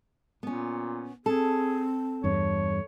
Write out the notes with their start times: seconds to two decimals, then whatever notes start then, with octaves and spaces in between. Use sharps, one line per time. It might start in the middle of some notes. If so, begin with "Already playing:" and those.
0.43 A#2 B3 C#4
1.26 C4 G#4 A4
2.24 E2 G2 C#5